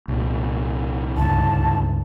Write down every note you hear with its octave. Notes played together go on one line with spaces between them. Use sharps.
C2 A#2
C#2 G2 A5